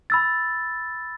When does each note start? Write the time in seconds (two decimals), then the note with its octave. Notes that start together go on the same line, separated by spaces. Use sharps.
0.10 B5 E6 A6